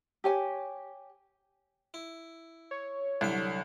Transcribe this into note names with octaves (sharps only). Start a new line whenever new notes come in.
G4 C#5 G#5
E4
C#5
C2 D3 F#3 B5